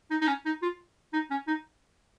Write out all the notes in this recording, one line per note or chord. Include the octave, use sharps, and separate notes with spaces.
D#4
D#4
C#4
D#4
F4
D#4
C#4
D#4